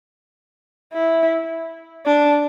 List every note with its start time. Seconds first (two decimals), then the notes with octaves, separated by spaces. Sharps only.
0.93 E4
2.06 D4